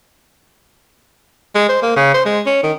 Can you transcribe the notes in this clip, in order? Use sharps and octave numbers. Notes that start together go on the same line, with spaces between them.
G#3
C5
A#3
C#3
C5
G#3
C#4
D#3